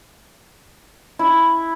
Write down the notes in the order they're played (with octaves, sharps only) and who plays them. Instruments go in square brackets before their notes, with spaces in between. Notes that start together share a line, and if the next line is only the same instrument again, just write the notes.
[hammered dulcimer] E4